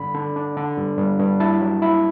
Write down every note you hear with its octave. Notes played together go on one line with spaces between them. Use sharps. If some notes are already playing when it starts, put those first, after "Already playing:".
Already playing: G2 D3 B5
D3
D4
D3
G2
G2
G2
E4 A5
F#3
E4